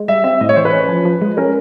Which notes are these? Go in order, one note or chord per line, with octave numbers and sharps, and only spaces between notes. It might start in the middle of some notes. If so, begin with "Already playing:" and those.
Already playing: G#3
G3 E5
C4 E5
A2 D#5
C#5
E3 C5
B4
C#4
F3
F3
G#3
C#4 A#4